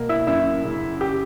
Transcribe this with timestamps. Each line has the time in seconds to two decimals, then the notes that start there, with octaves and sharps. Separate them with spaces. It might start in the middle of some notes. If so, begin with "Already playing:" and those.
Already playing: B2 A#3
0.09 E4 E5
0.27 F#2 E4 E5
0.64 C#3
1.01 G4 G5